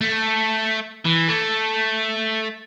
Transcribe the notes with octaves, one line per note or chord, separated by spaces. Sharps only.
A3
E3
A3